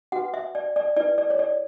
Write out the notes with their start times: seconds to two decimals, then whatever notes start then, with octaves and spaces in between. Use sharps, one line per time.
0.12 F#4 B4 F#5
0.34 E5
0.55 D5
0.76 D5
0.97 E4 B4 D5
1.18 D5
1.30 C#5
1.39 D5